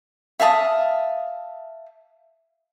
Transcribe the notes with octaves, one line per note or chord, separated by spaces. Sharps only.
E5 F5 A5 D#6